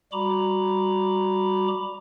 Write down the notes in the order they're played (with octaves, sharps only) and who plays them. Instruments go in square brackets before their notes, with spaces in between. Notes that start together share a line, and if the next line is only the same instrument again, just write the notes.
[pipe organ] G3 F#4 A#5 B5 D6